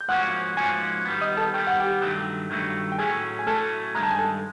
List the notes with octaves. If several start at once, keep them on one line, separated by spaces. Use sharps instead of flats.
G6
G#2 F3 A#3 C#4 F#4 F#5 F#6
G#2 F3 A#3 C#4 F#4 G#5 G#6
D#3 G3 B3
D#5 D#6
A4 A5
D#3 G3 B3 G5
F#5
G4 G5
G2 D#3 F#3 A3
G2 D#3 F#3 A3
G5
A2 F#3 A3 C#4 G#4 G#5
G#5
A2 F#3 A3 C#4 A4 A5
G2 D#3 G#3 A#5
A5
G#5
A4 A5